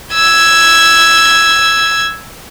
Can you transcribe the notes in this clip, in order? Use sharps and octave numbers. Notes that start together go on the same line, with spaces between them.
E6 G#6